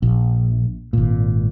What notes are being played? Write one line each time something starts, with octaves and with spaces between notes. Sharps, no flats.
A#1
G#1 A#2